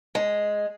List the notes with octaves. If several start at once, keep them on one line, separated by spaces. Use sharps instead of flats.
G#3